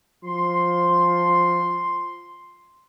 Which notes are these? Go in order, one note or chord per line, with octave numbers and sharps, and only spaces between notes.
F3 C6